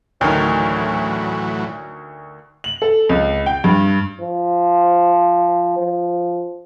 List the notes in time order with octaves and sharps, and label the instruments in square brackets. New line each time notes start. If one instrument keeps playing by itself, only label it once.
[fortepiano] D2 D#3 [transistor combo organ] A2 E3 F#3 [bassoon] C#4
[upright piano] F#7
A4
C#2
G5
G2
[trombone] F3
F3